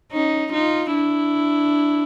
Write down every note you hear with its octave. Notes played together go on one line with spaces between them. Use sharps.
C#4 D#4
D#4 F4
D4 E4